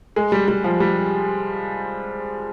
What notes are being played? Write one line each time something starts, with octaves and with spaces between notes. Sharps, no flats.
G#3
G3
G3
F3
G3